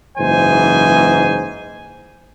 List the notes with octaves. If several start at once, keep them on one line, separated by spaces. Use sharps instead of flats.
F#1 G#2 E3 C5 G#5